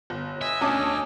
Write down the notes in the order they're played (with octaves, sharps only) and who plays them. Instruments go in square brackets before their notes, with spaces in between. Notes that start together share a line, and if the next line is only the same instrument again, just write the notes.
[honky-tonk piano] G1
[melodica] D#5 G#5 E6 [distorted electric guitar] E5
[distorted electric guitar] D2 [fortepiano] C#4 [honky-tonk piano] A5 D6 D#6